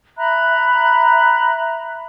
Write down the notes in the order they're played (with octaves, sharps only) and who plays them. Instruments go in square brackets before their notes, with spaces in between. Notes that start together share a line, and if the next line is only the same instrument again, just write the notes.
[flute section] E5 A#5 B5 F#6